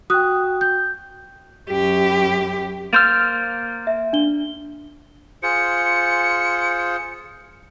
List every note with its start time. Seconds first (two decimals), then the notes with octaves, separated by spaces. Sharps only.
0.10 F#4 G5 D#6 F#6
0.61 G6
1.70 F#2 G4
2.93 A#3 C5 F6 G6 A6
3.87 E5
4.13 D4 G7
5.43 F4 G#4 C5 C#7